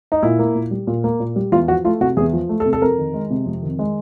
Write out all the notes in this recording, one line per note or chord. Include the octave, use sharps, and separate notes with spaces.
D#4
A#2 E4
A#3
A#2
G3
A#2
A#3
A#2
G3
E2 F4
F3 F#4
A3 F4
C3 F#4
E2 G#4
F3
A3
A4
C3
A4
F2 A#4
D#3
G#3
C3
F2
D#3
G#3